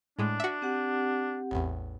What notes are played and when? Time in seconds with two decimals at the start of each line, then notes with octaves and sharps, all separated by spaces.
0.19 A2 G#3 D4
0.40 F#4 E5
0.62 C4 G4 F#5
1.51 A1 E2